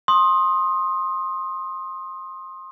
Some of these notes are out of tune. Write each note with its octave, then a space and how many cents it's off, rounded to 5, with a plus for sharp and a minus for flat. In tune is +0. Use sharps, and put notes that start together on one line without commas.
C6 +20 D#6 +0